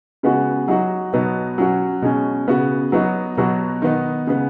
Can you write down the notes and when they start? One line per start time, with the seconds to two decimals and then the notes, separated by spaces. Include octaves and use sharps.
0.23 C#3 G#3 B3 F#4
0.68 F#3 D#4 F#4
1.13 B2 F#3 B3 D#4
1.58 F#3 C#4 F#4
2.02 B2 G#3 C#4
2.47 C#3 B3 F#4
2.92 F#3 B3 D#4 F#4
3.37 B2 F#3 B3 F#4
3.82 D#3 B3 D#4
4.27 C#3 G#3 B3